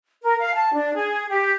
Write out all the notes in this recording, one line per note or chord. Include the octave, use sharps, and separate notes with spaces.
A#4
F5
A5
D4
G#4
G4